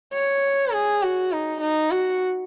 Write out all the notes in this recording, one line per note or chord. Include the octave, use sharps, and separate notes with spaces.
C#5
G#4
F#4
D#4
D#4
F#4